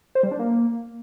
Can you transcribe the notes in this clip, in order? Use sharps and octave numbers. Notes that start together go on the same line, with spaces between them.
C5
G3
D4
A#3